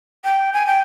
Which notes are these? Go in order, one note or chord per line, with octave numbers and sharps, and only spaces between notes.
G5
G#5
G5